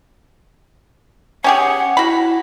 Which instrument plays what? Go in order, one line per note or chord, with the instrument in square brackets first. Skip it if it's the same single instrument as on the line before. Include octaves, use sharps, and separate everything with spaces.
[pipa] C#4 G4 G#4 [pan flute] F#5
[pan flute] E4 [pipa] F#4 B5